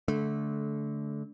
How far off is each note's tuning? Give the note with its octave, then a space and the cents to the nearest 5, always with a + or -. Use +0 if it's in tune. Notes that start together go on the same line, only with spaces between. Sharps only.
D3 -20 A3 -25